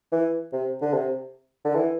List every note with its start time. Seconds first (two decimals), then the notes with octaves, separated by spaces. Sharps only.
0.12 E3
0.53 C3
0.82 D3
0.94 C3
1.65 D3
1.75 E3